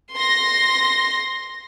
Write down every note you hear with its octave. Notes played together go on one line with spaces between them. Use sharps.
C6 A#6